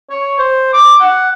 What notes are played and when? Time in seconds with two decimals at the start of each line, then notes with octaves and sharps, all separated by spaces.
0.10 C#5
0.38 C5
0.73 D6
1.00 F#5